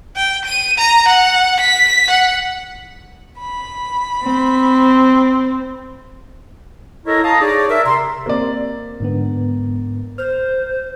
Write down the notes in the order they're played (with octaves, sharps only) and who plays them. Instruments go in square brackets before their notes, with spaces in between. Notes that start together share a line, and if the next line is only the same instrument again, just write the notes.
[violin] G5
D#7
A#5
F#5
B6
F#5
[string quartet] B5
[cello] C4
[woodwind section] E4 A4 A#4 C#5 D#5
F5 A5 A#5 D#6
D#4 G#4 C#5 D5
A#4 E5
C3 A#5 C6
[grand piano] A#3 D5 [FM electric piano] C4 C5
[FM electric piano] G#2 D3 B3
[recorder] C5 [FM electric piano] F6